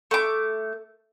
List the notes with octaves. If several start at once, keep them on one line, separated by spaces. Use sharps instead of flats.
A3 D6